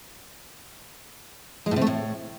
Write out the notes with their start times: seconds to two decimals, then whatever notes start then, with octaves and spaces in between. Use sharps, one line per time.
1.66 G#3
1.71 A2
1.76 C3
1.82 A3
1.87 A2